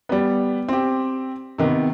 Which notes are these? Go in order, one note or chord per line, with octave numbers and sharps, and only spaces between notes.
G3 B3
C4 G4
C3 D#3 B3